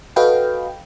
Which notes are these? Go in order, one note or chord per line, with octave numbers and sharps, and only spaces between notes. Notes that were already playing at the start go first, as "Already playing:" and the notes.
F#4 A4 B4 D#5 F5 G5